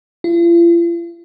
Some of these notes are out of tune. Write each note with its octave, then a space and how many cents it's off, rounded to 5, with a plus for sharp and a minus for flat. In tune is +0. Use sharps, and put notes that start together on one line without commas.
F4 -45